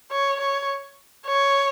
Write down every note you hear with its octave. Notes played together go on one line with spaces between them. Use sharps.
C#5
C#5
C#5